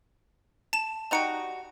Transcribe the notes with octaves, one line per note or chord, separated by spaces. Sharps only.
A5 E7
G3 D#4 F#4 G5 C#7 F7